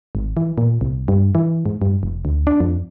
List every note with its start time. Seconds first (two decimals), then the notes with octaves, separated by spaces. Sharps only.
0.15 G#1
0.37 E3
0.58 A#2
0.81 C2
1.08 G2
1.35 E3
1.66 G#2
1.82 G2
2.03 F1
2.25 D2
2.47 D4
2.60 F2